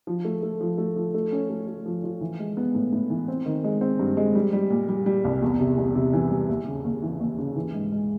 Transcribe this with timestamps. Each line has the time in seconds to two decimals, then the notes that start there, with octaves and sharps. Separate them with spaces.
0.07 F3
0.25 A3
0.43 A3
0.61 F3
0.78 A3
0.96 F3
1.14 A3
1.32 C#4
1.50 A3
1.68 A3
1.86 F3
2.04 F3
2.21 E3
2.39 G#3
2.57 B3
2.75 A2
2.93 A2
3.10 E3
3.28 C4
3.46 D#3
3.64 G#3
3.81 C4
3.99 G2
4.17 G#3
4.35 G3
4.53 G3
4.70 A#2
4.89 G3
5.06 G3
5.25 C2
5.42 E2
5.60 C3
5.78 E2
5.95 C3
6.13 E3
6.31 G3
6.49 D#2
6.67 C#3
6.85 D#2
7.02 E3
7.20 D#2
7.38 C#3
7.56 E3
7.74 G#2
7.92 G#3